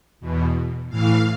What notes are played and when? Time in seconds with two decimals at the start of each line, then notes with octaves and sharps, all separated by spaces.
0.20 E2 B2
0.90 A2 E3 F5